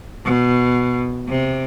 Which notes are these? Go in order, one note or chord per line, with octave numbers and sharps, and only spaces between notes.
B2
C3